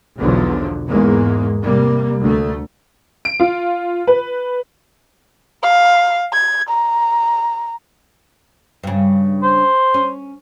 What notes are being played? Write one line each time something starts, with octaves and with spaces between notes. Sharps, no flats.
B1 E2 B2 D3 F3 F#3
E2 G#2 G#3 A#3
C3 G3 A#3
D2 A3
D7
F4
B4
F5
G#6
A#5
G2 C#3
C5
C#4